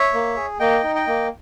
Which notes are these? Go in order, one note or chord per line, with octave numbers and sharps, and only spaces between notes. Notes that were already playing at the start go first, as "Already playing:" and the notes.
Already playing: C#5 E5
A#3
G#4
A#3 D#5 G5
D#4
D#5 G5
A#3